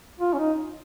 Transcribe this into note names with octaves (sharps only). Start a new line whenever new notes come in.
F4
C#4
D#4